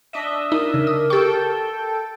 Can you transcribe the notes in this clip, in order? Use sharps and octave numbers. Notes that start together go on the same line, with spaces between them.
D4 D#5 E5
D#4 A#4
C#3
D#6
G4 A4 G5 C#6